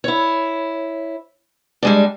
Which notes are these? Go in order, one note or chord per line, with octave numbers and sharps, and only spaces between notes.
E4 C#5
G3 G#3 D4